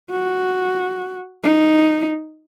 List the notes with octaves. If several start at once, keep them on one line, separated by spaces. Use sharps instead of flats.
F#4
D#4